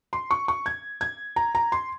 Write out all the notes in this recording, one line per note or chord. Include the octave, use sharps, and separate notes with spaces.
C6
C#6
C#6
G#6
G#6
A#5
A#5
C6